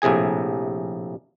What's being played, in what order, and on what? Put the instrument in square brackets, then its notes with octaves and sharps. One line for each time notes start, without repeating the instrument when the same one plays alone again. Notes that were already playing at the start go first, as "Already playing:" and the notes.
[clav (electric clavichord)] A#1 A2 C3 G#4 G#5